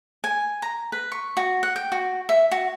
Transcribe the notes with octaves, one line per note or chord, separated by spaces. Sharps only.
G#5
A#5
B4
C#6
F#4
F#5
G5
F#4
E5
F#4